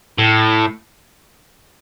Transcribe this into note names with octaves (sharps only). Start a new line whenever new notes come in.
A2